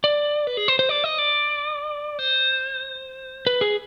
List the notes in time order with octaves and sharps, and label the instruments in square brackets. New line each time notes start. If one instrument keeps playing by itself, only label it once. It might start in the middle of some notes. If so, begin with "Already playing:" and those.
[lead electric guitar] D5
B4
G#4
C5
C5
D5
D#5
D5
C5
B4
G#4